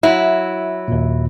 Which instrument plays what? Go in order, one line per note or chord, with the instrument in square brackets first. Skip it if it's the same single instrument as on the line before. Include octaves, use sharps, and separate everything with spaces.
[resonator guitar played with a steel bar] F#3 E4 [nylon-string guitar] E5
[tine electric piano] D#2 A#2